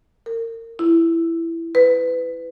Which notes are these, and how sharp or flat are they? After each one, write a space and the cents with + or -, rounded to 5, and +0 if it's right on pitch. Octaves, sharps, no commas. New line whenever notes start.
A#4 -25
E4 +10
B4 +20